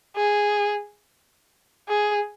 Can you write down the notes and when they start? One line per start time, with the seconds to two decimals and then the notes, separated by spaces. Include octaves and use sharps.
0.16 G#4
1.89 G#4